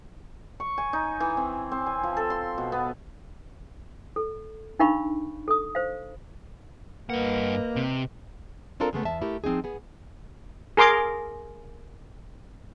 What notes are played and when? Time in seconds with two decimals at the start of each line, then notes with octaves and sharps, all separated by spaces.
0.60 C#6
0.78 G#5
0.93 D#4
1.20 E3
1.37 C4
1.72 C4
1.86 G#5
2.03 F3
2.17 A4
2.30 C6
2.58 B2
2.72 B3
4.16 A4
4.79 D4 D#4 A#4 F5 B5 C#6
5.48 A4 D#6
5.75 C5 F5
7.10 G2 A#3 B4 D#5 F#5
7.76 C3
8.80 C4 D4 F4 A4 A#4
8.93 C#3 G#3 A3 B3
9.05 E2 E5 A5
9.21 A3 E4 G4 A#4
9.44 F3 C4 D#4 G#4
9.64 B3 G#4
10.77 G#4 A#4 C6 D6